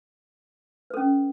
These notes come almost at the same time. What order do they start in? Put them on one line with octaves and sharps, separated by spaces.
B4 A4 C#4